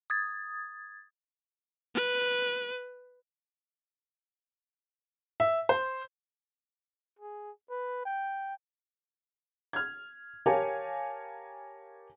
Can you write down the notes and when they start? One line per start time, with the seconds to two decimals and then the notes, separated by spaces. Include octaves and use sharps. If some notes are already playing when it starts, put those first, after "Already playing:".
0.10 D#6 G#6 A6
1.94 B4
5.40 E5
5.69 C5
7.19 G#4
7.70 B4
8.05 G5
9.73 F6 G#6
10.46 G4 A#4 C#5 F5 G#5 A5